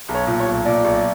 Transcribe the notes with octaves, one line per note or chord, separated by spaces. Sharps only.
B1
C#5
A#2
C#5
B1
A#2 D5
B1